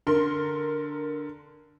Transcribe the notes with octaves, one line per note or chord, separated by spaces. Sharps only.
D3 A#4 C6